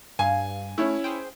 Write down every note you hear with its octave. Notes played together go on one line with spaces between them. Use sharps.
G2 F5 G#5
A3 C#4 E4
G#4 C5 G5